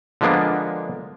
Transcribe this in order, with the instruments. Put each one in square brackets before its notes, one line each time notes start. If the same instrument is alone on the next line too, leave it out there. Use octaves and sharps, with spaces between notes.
[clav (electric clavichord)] D3 F3 G#3 A#3 B3 D4